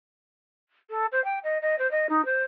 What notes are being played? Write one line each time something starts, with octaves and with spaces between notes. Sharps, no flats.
A4
C5
G5
D#5
D#5
C5
D#5
D#4
C5